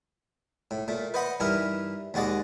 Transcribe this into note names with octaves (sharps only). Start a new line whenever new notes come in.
A2
A#2 A3
B4 C5 D#5 F#5 B5
G2 E3 D#4 E4 A#4
D#2 G#3 F#4 D5 D#5